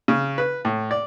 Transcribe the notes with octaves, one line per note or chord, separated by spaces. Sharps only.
C#3
B4
A2
D5